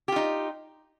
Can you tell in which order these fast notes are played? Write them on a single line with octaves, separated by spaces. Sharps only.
G4 F4 D#4